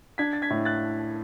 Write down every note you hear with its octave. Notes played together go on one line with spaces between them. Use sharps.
D4 G#6 B6
A6
G#6 B6
A2
F#6 A6